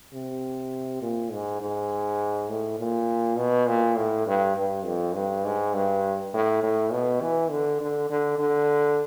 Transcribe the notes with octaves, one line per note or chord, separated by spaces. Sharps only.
C3
A#2
G#2
G#2
A2
A#2
B2
A#2
A2
G2
G2
F2
G2
G#2
G2
A2
A2
B2
E3
D3
D3
D3
D3